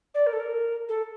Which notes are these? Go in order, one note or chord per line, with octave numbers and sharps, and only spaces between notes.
D5
A#4
A4
A#4
A4